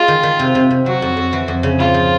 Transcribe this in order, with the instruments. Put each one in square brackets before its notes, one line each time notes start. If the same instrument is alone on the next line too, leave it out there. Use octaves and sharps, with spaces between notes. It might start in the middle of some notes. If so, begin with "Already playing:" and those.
Already playing: [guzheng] G#3 [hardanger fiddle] F4
[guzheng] D#3
D#3
C3
C3
C3
[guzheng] F#3 [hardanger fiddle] F#4
[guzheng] F2
F2
E3
F2
C#3
[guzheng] G#2 [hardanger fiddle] F4
[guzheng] F3